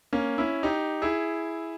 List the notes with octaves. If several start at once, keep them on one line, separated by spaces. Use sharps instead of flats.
A#3 C#4
C#4 E4
D#4 G4
E4 G#4